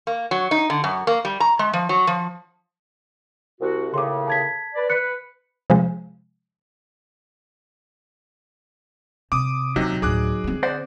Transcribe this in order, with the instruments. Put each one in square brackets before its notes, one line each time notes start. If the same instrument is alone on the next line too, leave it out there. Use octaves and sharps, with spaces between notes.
[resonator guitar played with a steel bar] A#3
F#3
D#4
D3
F#2
A#3
G3
A#5
G#3
F3
F#3
F3
[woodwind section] C2 F#4
[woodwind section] D#2 A2 C#3 [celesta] C6 D6
[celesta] A5 G#6 B6
[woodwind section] B4 D5
[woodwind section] B4 [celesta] F#6 C#7
[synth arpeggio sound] C3 F3 G#3
[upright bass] C3 [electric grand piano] D6 D#6
[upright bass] D#2 [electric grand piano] C3 [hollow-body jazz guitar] F#3 D#4
[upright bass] D2 A2 [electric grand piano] G#4 D6 F#6
[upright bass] D3 C4
[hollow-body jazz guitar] C5 D5 F#5